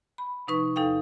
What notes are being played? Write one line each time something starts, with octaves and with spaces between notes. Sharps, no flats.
B5
C3 F3 D#4 B4 C#6
E2 D#4 A4 F5 G5